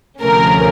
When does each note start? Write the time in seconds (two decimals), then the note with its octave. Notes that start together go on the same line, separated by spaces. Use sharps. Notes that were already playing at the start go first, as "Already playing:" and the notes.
0.21 D2 C3 F3 A3 C#4 A#4